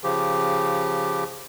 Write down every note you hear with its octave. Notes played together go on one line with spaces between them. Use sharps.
C#3 F3 G4